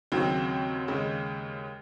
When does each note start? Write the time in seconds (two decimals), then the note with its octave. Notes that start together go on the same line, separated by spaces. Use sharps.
0.12 D#2 C#3 F#3 C4
0.88 D#2 C#3 G#3